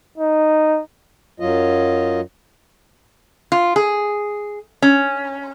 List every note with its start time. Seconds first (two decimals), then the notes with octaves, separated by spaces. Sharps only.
0.18 D#4
1.40 F#2 F#3 F4 D#5
3.52 F4
3.76 G#4
4.82 C#4